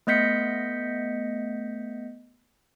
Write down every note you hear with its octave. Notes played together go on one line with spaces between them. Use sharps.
A3 B3 D#5 G6 B6 C#7